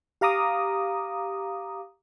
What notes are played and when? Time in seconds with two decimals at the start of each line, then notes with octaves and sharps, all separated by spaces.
0.21 G4 F5 A#5 D6 D#6